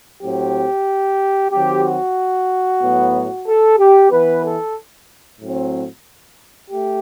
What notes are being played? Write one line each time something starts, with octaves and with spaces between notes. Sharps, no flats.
A2 F#3 C4 G4
D#3 F#3 C4 G4
F#4
A2 F#3 B3
A4
G4
E3 B3 B4
A4
A2 F#3 C4
A3 G4